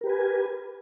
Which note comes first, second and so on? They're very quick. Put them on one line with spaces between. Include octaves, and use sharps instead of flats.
A#4 G4 B4 G#5